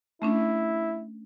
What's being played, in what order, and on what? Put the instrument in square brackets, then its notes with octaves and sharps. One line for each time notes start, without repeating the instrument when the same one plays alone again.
[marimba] A3 C#4 D4 [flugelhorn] E4